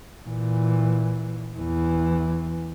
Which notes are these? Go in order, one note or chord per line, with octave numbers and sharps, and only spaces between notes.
A#2 E3
E2 E3